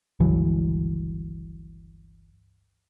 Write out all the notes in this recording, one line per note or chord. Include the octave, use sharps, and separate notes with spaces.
G1 C#2 E3 F#3